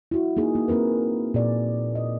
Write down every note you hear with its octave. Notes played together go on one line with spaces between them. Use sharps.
E4 F#4
A#3 D#4 G#4
A#3
A#3 C4 A#4 B4
A#2 G#4 D5
D#5